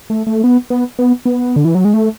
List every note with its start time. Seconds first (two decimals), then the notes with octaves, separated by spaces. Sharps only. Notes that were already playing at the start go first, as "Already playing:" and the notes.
0.10 A3
0.27 A3
0.44 B3
0.70 B3
0.99 B3
1.25 B3
1.56 D3
1.65 E3
1.75 F#3
1.85 G#3
1.94 A3